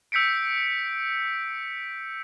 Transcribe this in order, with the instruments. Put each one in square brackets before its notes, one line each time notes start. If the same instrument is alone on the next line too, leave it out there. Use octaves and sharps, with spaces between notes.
[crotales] E6 G6 B6 C#7 D7